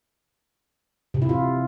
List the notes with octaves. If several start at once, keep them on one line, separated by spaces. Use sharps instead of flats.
C3
E4
F4